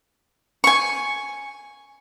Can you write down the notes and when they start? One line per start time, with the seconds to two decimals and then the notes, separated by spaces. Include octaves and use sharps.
0.64 G#5 C#6